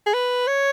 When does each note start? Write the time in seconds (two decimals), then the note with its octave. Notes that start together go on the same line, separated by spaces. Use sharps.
0.06 G#4
0.14 B4
0.47 C#5